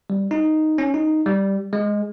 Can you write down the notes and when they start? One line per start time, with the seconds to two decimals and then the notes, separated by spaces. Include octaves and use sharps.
0.10 G3
0.31 D#4
0.78 C#4
0.94 D#4
1.26 G3
1.73 G#3